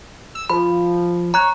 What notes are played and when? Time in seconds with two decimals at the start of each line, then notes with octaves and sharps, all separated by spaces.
0.35 E6
0.50 F3 B5
1.34 C#5 A#5 F#6